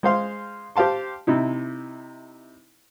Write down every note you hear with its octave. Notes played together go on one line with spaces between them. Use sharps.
G#3 C5 F5 C6
G4 C5 F5 A5 C6
C3 D#4 E4